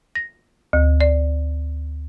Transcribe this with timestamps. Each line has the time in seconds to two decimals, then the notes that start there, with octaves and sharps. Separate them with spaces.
0.15 A#6
0.73 D2
1.01 D5